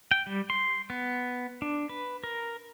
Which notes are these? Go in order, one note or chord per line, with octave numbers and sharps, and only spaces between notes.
G5
G3
C6
B3
D4
B4
A#4